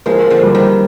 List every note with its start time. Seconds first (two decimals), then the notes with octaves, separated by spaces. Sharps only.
0.06 F3 G#3 A#3
0.30 D3 F3
0.43 G3
0.55 D#3